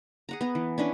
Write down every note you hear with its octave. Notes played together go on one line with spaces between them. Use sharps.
G#4 F#5 A#5
B3 A#5
E3
C#4 D4 E4 B4